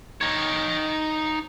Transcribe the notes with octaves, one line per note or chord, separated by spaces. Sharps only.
D#4 C#5